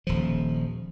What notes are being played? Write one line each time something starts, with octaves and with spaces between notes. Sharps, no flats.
D#1 F3